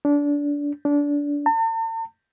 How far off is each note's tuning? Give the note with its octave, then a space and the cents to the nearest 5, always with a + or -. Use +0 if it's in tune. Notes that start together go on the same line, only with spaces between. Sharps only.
D4 -25
D4 -25
A5 +45